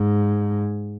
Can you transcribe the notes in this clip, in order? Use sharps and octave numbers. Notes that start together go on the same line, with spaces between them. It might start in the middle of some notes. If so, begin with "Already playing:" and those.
Already playing: G#2